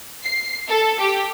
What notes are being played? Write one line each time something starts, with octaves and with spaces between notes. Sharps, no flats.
C7
A4
G4